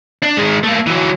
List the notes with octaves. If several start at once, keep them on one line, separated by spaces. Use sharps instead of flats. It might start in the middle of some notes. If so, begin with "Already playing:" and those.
D4
D#3 G#3
A3 A#3
E3 F#3